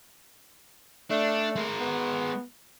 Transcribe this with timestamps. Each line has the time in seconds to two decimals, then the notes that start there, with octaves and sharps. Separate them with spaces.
1.11 A3 D4
1.56 G#3 A#4
1.80 B3